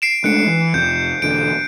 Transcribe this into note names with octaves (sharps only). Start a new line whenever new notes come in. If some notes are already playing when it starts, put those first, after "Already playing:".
C7 D7 E7
G#3 A3 D4 F#6 C#7
E3
F1 F2 G6
E1 D3 D7